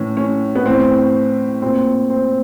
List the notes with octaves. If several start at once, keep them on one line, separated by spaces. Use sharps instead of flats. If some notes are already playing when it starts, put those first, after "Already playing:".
Already playing: A2 E3 C#4
C#4
B3
A2 E3 C4
A#2 C4
C4